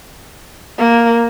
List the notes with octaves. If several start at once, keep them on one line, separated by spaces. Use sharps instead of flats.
A#3